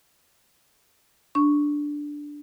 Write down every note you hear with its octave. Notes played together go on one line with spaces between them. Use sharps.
D4 C#6